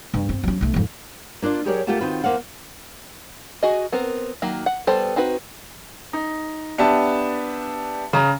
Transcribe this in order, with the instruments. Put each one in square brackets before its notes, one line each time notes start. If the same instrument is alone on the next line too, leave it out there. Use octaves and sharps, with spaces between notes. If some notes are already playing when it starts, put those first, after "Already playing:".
[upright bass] G2
C4
F#3 C#4
B1 A3
F2 G#2
[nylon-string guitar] A#3 D4 F4 D5
F#3 G4 G#4 A#4 C#5 D5
A3 A#3 F4 G4 F#5 A5
D#3 C4 F4 F#4 B4
E2 D#3 A#3 C5 F5 F#5
[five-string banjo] F#4 G#4 D#5
B3 C4 A#4
D#3 F#3 A#3
F#5
G3 B3 A4 C5 G5
C4 D#4 F#4 B4
[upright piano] D#4
B3 D4 G4 E5 A5
C#3 A#5